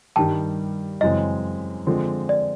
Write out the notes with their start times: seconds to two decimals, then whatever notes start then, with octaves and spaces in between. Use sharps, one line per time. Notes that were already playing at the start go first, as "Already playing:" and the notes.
0.16 G2 D#3 G3 G5 A5
1.01 F#2 C#3 E3 G#3 C4 D#5
1.87 D3 F3 G#3 C4
2.29 D5